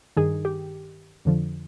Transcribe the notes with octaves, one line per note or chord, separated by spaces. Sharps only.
G2 D#3 G#4
G4
F2 D3 F3